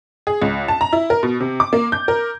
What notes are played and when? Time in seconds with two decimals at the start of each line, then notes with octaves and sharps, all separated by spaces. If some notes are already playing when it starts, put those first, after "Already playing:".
0.27 G#4
0.42 C#2
0.68 A5
0.81 A#5
0.93 E4
1.10 A#4
1.23 B2
1.40 C3
1.60 D6
1.73 A#3
1.92 G6
2.08 A#4